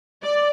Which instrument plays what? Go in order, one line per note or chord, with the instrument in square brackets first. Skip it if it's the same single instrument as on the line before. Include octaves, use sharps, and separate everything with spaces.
[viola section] D5